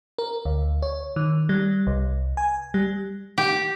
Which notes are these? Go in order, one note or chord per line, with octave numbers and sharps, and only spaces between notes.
A#4
D2
C#5
D#3
G3
C2
G#5
G3
G4